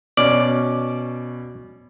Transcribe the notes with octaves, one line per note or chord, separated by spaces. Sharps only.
B2 C#4 D5 F6